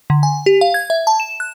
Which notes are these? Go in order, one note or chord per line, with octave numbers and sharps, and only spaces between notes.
D3
G#5
G4
F5
G#6
E5
A5
E7
F#6